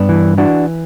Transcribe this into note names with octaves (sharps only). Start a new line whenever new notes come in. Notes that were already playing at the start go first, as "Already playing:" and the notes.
Already playing: G2 B3 D4
E3
E3 D4 F#4